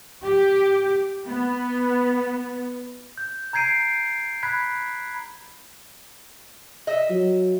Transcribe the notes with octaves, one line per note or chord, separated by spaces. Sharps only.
G4
B3
G6
A#5 G6 G#6 C7 D7 D#7
B5 F#6 G#6 B6
D#5 E5
F#3